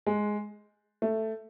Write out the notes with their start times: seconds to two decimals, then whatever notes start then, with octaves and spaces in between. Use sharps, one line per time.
0.07 G#3
1.02 A3